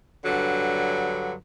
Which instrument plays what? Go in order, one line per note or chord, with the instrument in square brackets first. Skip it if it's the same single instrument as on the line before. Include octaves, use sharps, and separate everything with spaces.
[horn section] G2 D3 F#3